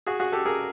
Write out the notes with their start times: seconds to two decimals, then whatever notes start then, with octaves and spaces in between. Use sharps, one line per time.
0.07 F#4 G#4
0.20 F#4 G#4
0.32 G4 A4
0.45 G#4 A#4